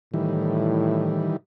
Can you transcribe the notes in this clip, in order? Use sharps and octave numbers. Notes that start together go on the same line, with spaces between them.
A2 D#3 E3 G3